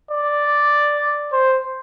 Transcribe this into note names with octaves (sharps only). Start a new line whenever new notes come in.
D5
C5